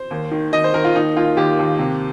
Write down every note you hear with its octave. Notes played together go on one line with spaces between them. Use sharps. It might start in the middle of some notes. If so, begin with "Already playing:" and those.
Already playing: C5
D#2
D#3
D#3 D#5
C5
D#3 A#4
F4
D#2 D#4
D#2 F4
D#2 G4
D#2
C3